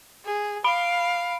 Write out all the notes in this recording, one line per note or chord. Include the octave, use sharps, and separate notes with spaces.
G#4
F5 B5 D7